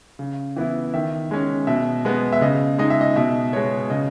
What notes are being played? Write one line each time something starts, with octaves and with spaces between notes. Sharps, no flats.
C#3
E3 B3 E4
D#3 E5
G#3 C#4
B2 E5
G#3 B3
E5
C#3 D#5
G#3 D#4 D#5
E5
D#5
B2 E5
G#3 B3 C#5
C#3 D#5